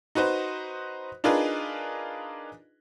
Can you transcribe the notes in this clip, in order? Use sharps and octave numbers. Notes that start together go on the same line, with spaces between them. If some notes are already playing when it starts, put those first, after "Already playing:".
D#4 F#4 B4 C5
D4 D#4 F4 G#4 A#4 B4